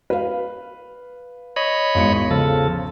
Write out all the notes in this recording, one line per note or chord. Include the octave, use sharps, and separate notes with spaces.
B4 F5
C#5 D#5 B5
G#1 E2 C#7
C#3 F3 A4